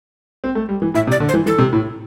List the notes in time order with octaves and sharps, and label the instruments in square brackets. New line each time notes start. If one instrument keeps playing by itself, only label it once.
[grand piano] C4
A3
G3
E3
[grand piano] A2 [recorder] E5
[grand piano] C3
[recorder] D5
[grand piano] D3
[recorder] C5
[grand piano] E3
[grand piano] E3 [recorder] A4
[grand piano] C3
A2